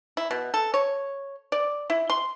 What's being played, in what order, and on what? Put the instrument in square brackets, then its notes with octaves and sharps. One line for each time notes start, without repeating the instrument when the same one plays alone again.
[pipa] E4
B2
A4
C#5
D5
E4
C6